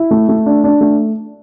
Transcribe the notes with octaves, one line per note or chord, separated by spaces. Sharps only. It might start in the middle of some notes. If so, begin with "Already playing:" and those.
Already playing: E4
A3
A3
D4
D4
A3